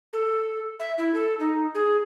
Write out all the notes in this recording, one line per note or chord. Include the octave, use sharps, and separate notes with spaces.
A4
E5
E4
A4
D#4
G#4